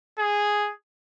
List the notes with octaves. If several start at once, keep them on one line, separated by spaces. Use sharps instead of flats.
G#4